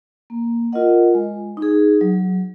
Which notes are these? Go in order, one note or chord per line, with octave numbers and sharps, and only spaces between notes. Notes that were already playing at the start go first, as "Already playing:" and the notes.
A#3
F4 A#4 D#5 F#5
G#3
D#4
G#4
F#3